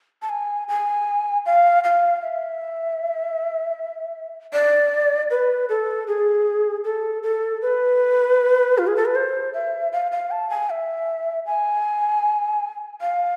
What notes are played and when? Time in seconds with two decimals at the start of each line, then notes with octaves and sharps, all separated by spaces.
0.22 A5
0.29 G#5
0.68 G#5
1.46 F5
1.84 F5
2.22 E5
4.53 D5
5.30 B4
5.69 A4
6.07 G#4
6.84 A4
7.23 A4
7.62 B4
8.78 F4
8.87 G#4
8.96 A4
9.05 B4
9.15 C5
9.54 E5
9.92 F5
10.11 F5
10.31 A5
10.50 G#5
10.70 E5
11.46 G#5
13.01 F5